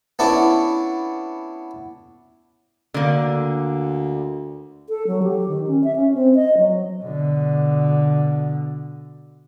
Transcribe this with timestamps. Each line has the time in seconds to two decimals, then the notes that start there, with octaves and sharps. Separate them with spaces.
0.19 B3 C#4 D4 E4 A4
2.94 D2 D3 A#3
4.89 A4
5.07 F#3
5.23 G4
5.49 D#3
5.67 C#4
5.84 E5
5.96 C#4
6.14 C4
6.35 D#5
6.57 F#3
7.03 B2 D3